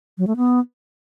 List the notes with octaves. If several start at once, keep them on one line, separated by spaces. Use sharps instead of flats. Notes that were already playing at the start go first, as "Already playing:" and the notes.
F#3
A3
B3